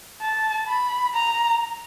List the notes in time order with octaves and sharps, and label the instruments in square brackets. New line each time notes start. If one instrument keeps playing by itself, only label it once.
[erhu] A5
B5
A#5